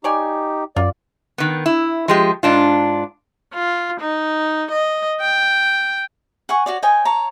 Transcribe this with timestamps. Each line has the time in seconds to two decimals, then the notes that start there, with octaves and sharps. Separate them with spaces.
0.04 D#4 G4 C#5 D5 G#5
0.76 F#2 F4 D5
1.38 D#3 B3
1.66 E4
2.08 F3 G#3 G4
2.43 G#2 D4 F4
3.53 F4
4.01 D#4
4.71 D#5
5.21 G5
6.49 F#5 G#5 C#6
6.66 F#4 C#5 D5
6.83 C#5 D#5 G5 G#5
7.05 C#5 A5 A#5